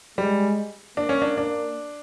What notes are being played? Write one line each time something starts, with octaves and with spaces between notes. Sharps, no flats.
G3 G#3
A#3 D4
C#4
D4
D4